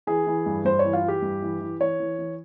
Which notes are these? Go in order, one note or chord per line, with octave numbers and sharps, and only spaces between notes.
E3 G#4
E3
G2
G2 C5
C#5
E3
F4
E3
G4
G2
E3
E3
E3 C#5
E3
E3